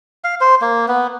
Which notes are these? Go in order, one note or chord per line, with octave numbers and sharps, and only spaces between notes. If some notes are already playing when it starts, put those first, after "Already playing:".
F5
C5
A#3
B3